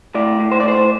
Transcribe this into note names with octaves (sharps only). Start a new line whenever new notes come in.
A2 D5
A2
C5
D5
A2 C5